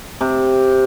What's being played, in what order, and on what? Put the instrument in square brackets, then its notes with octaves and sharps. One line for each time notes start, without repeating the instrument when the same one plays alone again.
[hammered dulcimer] C3